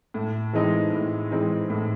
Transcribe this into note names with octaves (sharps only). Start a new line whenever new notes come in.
A2
E3 G#3 C4 D#4
A2
E3 G#3 C4 D#4
A2